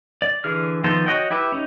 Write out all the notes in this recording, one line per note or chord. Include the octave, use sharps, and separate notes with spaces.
D5
D3 E3 G#4 F6
D#3 F3 B3 A4 C5
F#4 C#5 D#5 F#5 G5
E4 G4 B4 E5
C#4 D#4